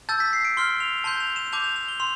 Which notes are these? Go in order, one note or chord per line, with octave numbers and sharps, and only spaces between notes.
A5 E6 G6 A6
B6
C7
D7
C6 F6 G7
F7
A5 C6 G6 G7
F7
E7
A5 D6 G6 F7
F7
F7
G7
C6 F7